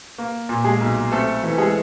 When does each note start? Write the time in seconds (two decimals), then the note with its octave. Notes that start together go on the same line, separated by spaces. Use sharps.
0.18 A#3
0.49 A#2
0.64 G#3 G#4
0.81 B1
1.12 A3 C4 A4
1.43 E3
1.58 G#3 G#4